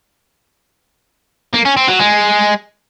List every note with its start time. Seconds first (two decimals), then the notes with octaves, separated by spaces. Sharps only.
1.54 A#3
1.65 C#4
1.77 C4
1.88 F#3
2.00 G#3